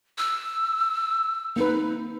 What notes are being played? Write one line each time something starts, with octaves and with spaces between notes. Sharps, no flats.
E6
A#3 C4 D#4 B4